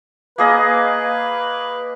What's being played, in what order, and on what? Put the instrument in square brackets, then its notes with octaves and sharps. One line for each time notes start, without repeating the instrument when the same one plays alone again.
[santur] A#3 G#4 D#5 [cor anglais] B4